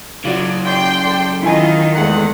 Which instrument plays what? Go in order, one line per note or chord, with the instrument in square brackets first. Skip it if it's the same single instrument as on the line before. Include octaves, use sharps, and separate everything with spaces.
[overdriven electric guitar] C#3 F#3 [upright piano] F4 F#4 [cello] D5
[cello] D5 [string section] G5 C6
[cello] A4 D5
[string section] D#3 [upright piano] E4 G#5 [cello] F4 D#5
[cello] E2 [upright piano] G#3 A3 [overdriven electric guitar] F#5